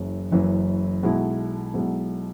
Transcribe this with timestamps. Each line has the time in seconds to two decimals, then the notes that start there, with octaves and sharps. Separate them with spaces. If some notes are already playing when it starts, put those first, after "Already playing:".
Already playing: F#1 F#2 E3
0.32 F#1 F#2 E3
1.03 B1 B2 G#3 E4
1.74 B1 B2 G#3 E4